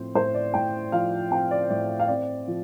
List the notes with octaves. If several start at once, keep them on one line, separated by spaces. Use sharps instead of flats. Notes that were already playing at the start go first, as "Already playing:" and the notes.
Already playing: A2 F3 C4 C5
A2 C5
D5
A2 G5
F3 F5
C4 G5
D5
A2 D5
F5
C4 D5
F3